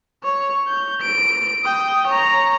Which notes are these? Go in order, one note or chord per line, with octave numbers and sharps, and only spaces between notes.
C#5
G6
D7
G5 D#6
C#5 A#5